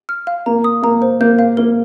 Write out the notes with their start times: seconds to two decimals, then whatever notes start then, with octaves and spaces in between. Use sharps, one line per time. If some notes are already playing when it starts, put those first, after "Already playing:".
0.09 F6
0.27 F5
0.46 A#3 A#5
0.64 D#6
0.83 A#3 A#5
1.02 C5
1.20 A#3 G6
1.39 F5
1.57 A#3 A#4